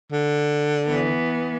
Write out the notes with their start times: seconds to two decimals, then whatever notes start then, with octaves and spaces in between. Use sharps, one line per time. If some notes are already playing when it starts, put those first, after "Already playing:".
0.12 D3
0.87 E3 B3